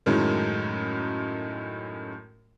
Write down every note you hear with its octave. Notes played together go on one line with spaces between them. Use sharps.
F#2 A2 D#3 F#3 G#3